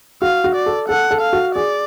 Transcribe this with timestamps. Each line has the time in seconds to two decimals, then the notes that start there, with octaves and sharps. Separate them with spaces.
0.22 F#4 F5
0.44 F#4
0.56 D5
0.66 A4
0.89 A4 F#5
1.11 A4
1.21 F5
1.33 F#4
1.55 G#4 D5